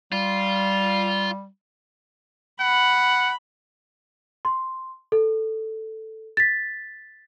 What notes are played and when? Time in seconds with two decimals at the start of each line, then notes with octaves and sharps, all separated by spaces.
0.12 G3 F4
2.60 F#5 B5
4.45 C6
5.12 A4
6.37 A6 B6